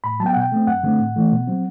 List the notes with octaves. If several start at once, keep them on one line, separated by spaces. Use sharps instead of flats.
A2 B5
F#3 B3 G5 A5
F#5
B2 G5
A3 C4
F#2 F#5
D3 A3 C4
A2
E3 A3
B2
F#3 C4